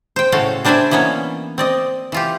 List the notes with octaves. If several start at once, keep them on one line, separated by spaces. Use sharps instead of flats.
C5 G5
A2 C#3 F#4 A4 F5
G3 D4 C5 D5 E5 G#5
E3 A#3 B3 C#4 C#5
C4 D5 D#5
E3 F4 G4